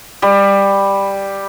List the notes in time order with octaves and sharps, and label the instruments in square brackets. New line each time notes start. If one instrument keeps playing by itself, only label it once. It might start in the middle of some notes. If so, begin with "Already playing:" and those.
[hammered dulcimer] G3